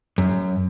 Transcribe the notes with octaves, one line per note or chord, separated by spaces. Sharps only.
F#2